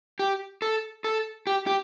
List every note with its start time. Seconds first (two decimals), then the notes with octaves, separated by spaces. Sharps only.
0.19 G4
0.62 A4
1.04 A4
1.47 G4
1.67 G4